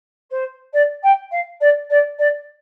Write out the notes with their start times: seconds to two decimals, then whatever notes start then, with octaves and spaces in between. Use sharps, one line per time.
0.30 C5
0.73 D5
1.03 G5
1.31 F5
1.61 D5
1.90 D5
2.19 D5